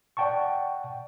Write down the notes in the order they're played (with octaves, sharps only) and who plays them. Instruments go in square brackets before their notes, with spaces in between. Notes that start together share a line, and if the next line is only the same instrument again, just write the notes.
[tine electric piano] D5 F#5 G5 A5 C#6